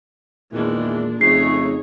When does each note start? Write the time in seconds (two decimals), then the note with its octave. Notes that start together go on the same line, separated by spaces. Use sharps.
0.53 E2 A#2 D#3 E3 G#3 D4
1.21 F2 C#3 A3 D#4 G#4 C#5 C7